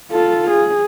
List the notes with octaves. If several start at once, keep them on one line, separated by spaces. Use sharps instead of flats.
F4 A4
G#4